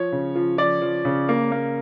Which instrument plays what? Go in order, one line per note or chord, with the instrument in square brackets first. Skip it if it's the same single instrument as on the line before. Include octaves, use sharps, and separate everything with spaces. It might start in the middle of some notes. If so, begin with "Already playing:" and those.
Already playing: [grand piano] F3 C#5
C#3
F3
F3 D5
F3
C#3
A#3
A#3